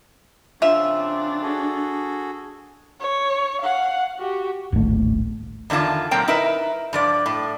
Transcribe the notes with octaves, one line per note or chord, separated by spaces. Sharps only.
C#3 F3 C4 D4 F4 E5
F#4 G#4 A4
C#5
F5 F#5
F#4 G4
D1 G#1 A2 A3
E2 D3 D#3 F4 A5
A#2 F#3 C4 A#4 G5
D#4 E4 A#4 B4 E5
G2 F3 D5
A2